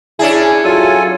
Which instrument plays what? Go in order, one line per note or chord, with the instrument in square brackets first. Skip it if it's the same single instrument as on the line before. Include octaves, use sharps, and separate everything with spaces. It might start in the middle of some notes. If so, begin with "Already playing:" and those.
[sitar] C#4 D4 G#4 [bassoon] E4
[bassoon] F#3 [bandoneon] F4 A4 G#5